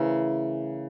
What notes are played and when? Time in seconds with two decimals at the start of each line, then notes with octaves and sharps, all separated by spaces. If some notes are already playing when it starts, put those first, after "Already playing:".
Already playing: C#3 E3 A3 A#4 C5